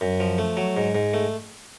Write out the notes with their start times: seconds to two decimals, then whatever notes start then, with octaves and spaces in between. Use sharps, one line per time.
0.01 F#2
0.20 F3
0.38 A3
0.57 F#3
0.77 G#2
0.95 G#2
1.14 A3